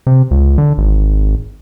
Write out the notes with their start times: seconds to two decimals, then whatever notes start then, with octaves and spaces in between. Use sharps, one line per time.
0.07 C3
0.31 C#2
0.58 D3
0.78 G#1